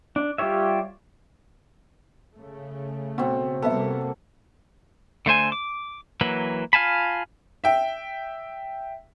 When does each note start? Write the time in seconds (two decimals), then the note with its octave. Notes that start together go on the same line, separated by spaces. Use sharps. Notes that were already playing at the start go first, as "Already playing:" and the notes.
0.16 D4
0.38 G3 F4 G4 C#5 E5
2.35 C#3 A3
3.18 B2 C4 F#4
3.62 C3 G3 A#3 B3 A4 E5
5.26 D3 A3 C5 G#5
5.52 D6
6.21 E3 F#3 A#3 B4
6.73 F4 F5 G#5 A5 B5
7.64 E5 G5